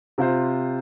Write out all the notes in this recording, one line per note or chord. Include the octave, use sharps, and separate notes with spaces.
C3 F4 C5